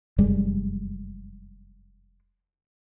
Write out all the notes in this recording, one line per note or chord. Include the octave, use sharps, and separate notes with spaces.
F1 F#2 G3 G#3